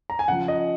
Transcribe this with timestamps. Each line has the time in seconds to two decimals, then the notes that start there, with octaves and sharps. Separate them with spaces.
0.10 A#5
0.19 G#5
0.28 C#3 F3 F#5
0.48 D#5